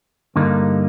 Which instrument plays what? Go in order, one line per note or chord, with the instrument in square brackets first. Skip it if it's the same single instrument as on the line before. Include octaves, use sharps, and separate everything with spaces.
[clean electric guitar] G2 D3 G3 A#3 D#4